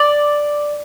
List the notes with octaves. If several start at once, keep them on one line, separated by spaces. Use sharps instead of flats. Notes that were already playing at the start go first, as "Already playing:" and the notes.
Already playing: D5